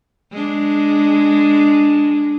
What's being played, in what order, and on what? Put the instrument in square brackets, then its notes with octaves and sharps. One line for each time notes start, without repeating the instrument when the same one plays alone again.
[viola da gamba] G#3 D4